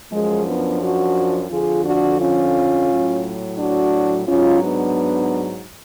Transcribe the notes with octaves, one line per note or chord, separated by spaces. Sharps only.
F#2 F3 G#3
B3 D4
D4 F#4
F2 D3 F3 F4 G#4
D4 F#4
C#4 F4
A2 F#3
D4 F#4
G#2 F#3 C#4 F4
B3 D4